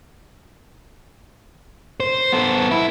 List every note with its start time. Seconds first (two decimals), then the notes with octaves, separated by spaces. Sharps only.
2.00 C5
2.33 B3 A4
2.71 E4